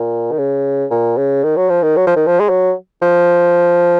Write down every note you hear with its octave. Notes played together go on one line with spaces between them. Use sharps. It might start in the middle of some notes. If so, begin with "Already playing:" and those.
Already playing: A#2
D#3
C#3
A#2
C#3
D#3
F#3
F3
D#3
F#3
F3
D#3
F3
G#3
F#3
F3